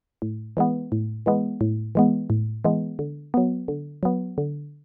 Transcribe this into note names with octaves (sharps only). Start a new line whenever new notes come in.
A2
E3 G#3 B3
A2
E3 G#3 B3
A2
E3 G#3 B3
A2
E3 G#3 B3
D3
F#3 B3
D3
F#3 B3
D3